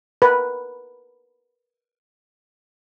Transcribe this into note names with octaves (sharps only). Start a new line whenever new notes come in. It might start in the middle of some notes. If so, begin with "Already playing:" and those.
A#4 B4